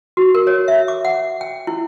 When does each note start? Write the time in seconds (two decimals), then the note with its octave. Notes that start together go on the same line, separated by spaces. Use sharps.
0.17 F#4
0.35 A#4
0.47 C#5
0.68 E5
0.88 D6
1.05 F#5
1.41 G5
1.67 E4